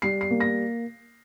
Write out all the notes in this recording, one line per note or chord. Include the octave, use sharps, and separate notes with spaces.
G3 C7
C7
A#3
A#6